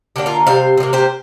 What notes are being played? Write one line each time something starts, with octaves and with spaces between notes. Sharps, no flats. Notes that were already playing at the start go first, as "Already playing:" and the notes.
D3 A#3 D4 G4
F4 A#4
C3 G3 C4 C5 F5
C3 F3
A#3
G4 C5